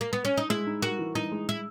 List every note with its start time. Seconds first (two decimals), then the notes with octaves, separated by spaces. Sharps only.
0.01 A#3
0.13 B3
0.25 C#4
0.37 D#4
0.50 G#3 E4
0.67 D#4
0.82 F#4 A#4
0.99 E3
1.15 E3 D#4
1.32 G#3
1.49 E4